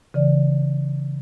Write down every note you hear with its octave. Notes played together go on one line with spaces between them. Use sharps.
C#3 E3 D5